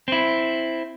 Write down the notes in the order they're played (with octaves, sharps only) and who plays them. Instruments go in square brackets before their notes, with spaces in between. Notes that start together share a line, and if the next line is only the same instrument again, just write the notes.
[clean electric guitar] C4 E4